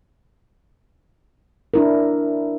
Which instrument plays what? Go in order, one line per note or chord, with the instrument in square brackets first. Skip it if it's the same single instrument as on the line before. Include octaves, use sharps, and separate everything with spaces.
[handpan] D4 E4 A#4